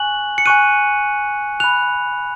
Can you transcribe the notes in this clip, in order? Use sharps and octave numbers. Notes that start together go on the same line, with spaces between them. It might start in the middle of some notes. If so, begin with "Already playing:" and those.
Already playing: G#5 C#6 F#6 F#7
C#7
G#5 C#6 F#6 D#7
B5 F#6 F7